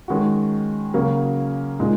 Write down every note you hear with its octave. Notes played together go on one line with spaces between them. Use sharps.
D#3 G#3 C#4 F#4
C#3 F#3 A#3 C#4 F#4
A#2 G#3 D#4